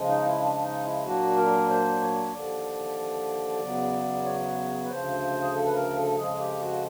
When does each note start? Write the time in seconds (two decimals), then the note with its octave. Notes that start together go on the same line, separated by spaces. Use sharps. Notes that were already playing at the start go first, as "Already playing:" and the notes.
Already playing: C#3 F3 G#3
0.09 D#4
0.25 E4
0.40 D4
0.62 D#4
0.84 E4
1.05 A#2 F#3 A#3 D4 F#4
1.36 A#4
1.69 C5
2.01 C#5
2.33 D#2 D3 F3 D5
3.61 E2 C#3 F#3 B3
4.25 C#5
4.85 B4
4.89 D2 C#3 F3 C5
5.42 G#4
5.54 A4
5.66 B4
5.74 A#4
5.96 A4
6.17 F2 C#3 F3 G#3 G#4
6.39 G4
6.60 F#4